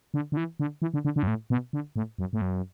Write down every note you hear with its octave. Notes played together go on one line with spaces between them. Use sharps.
D3
D3
E3
D3
E3
D3
D3
D3
F#2
A2
B2
D3
A2
F#2
A2
F#2